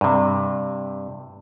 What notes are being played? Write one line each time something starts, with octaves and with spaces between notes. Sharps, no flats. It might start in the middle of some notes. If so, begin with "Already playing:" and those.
G2 C3